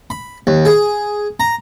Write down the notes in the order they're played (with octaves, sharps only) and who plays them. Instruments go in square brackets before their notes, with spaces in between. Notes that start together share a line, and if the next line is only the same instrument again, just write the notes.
[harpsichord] B5
D#2
G#4
A#5